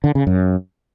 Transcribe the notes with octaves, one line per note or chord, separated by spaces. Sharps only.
D3
C#3
F#2